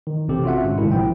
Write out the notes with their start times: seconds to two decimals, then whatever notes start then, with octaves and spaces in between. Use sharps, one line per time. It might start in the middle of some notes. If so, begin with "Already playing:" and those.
0.07 D#3
0.28 A1 C3 C4 G4 A4
0.44 C#4 F4 F#4 E5 F#5
0.64 G#2 D3
0.78 A2 C3 D#3 G#3 E4
0.92 A#1 F3 G5